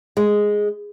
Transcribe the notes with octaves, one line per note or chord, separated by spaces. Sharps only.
G#3